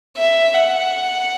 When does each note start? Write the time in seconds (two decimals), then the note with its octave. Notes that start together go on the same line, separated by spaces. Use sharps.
0.17 E5
0.53 F#5